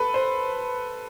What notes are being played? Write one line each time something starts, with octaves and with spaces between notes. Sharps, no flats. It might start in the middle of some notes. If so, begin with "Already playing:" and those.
Already playing: A4 B4
C5